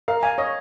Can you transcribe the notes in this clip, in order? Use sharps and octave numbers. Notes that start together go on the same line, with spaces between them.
A#4 F5
F5 G#5
C#5 D#5